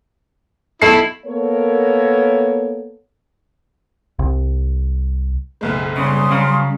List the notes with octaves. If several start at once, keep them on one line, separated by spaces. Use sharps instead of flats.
B1 E4 A4 C7
A#3 B3 A4 A#4 C#5
C2
F#1 B1 G#3
C#3 G3 C#4 C6 D#6
C#3 F#3 F5